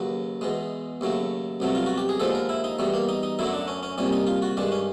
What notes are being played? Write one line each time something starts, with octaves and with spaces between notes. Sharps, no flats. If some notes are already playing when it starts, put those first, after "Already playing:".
Already playing: D#2 C#3 F#3 B4
E2 B2 G#3
D#2 C#3 F#3 A3
C2 B2 F#3 A3
F4
F#4
G4
G#4
D#2 D3 F3 G#3 A4
A#4
E4
D#4
E2 B2 G3 A3
A#3
D#4
D#4
F#2 D3 F#3 A3 E4
D4
C#4
C#4
C2 A#2 G3 C#4
D#4
F4
F#4
G2 D#3 G#3 D4
C#4